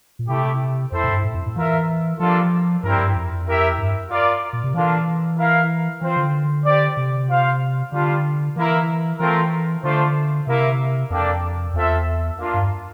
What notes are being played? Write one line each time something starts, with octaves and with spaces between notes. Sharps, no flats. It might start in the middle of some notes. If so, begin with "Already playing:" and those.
A#2
C3 A3 E4 G4
F2 C4 E4 A4 C5
A2
G2
A2
F2
A2
E3 F4 A#4 E5
F3 G3 A#3 D4 F4 A4
G2 G3 C4 E4 A#4
G2
F2
E4 G4 A#4 E5
G2
F4 A#4 D5
A#2
C3
E3 A#3 D4 F4 A4
E4 A#4 F5
E3 C4 F4 C5
D3
C4 G4 D5
C3
F4 C5 F5
D3 G3 D4 F4
E3 A#3 E4 A#4
E3 A3 C4 F4 A#4
D3 A3 D4 F4 C5
C3 A#3 E4 A#4 E5
F2 A#3 D4 A4 D5 G5
E2 C4 F4 A4 E5
A#3 D4 F4
G2